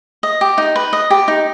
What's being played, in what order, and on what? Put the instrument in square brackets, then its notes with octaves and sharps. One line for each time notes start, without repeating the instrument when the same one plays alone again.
[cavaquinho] D#5
G4
D#4
B4
D#5
G4
D#4